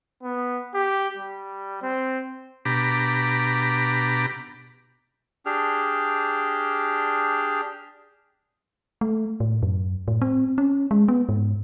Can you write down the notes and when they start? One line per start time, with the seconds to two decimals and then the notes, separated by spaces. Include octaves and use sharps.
0.23 B3
0.74 G4
1.17 G3
1.82 C4
2.65 B2 D4 G4 A#5 B5 D6
5.46 D4 G4 G#4 F6
9.01 A3
9.40 A2
9.63 F#2
10.08 A2
10.22 C4
10.58 C#4
10.91 G#3
11.08 B3
11.29 G#2